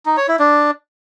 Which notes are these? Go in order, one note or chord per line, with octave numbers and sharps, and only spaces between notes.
D#4
C#5
E4
D4